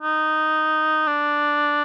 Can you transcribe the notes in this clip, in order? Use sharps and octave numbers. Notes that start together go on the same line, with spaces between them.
D#4
D4